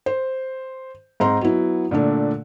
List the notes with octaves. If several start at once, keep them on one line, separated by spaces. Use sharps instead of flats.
C5
G#2 C4 A#5 C6
F#3 B3 E4
A#2 D3 A3 D4